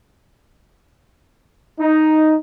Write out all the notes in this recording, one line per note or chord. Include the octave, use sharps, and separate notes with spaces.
D#4